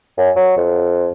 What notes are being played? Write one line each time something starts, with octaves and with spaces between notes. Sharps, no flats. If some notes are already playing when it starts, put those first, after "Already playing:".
F#2
F#3
F2